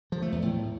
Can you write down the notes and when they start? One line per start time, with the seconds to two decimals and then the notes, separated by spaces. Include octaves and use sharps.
0.12 F3
0.22 A3
0.32 E2
0.42 A2